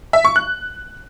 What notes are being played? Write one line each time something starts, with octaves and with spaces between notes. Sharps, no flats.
E5
C#6
F#6